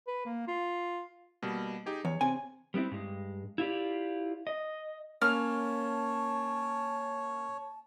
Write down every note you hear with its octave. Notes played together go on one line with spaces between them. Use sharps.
B4
A#3
F4
B2 G3 A#3
D#4 G4 G#4
E2 C#5
C3 G#5
G3 B3 C4 E4
G2 G#3
E4 F4 G4 D5
D#5
A#3 C#4 C#5 A5 F6